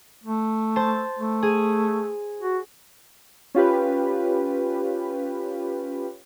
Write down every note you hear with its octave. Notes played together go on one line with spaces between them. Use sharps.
A3
C5 A5 E7
A3
G#4
F#4
C#4 F4 G4 B4